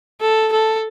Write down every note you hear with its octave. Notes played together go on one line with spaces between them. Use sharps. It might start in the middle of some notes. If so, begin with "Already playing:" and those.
A4
A4